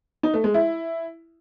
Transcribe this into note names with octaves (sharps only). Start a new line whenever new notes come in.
D#4
A3
G#3
E4